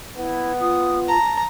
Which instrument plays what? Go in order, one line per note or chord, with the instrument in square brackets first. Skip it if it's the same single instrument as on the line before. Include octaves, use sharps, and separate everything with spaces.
[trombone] B3 [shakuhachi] E4
[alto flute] F4 [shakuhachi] D#6
[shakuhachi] A5 [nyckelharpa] A#5